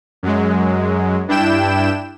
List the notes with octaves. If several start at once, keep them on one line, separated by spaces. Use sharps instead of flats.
F#2 F#3 G#3
G2 D4 E4 G5 E7